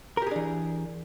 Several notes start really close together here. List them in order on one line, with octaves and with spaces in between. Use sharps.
A#4 G4 G#4 D4 E3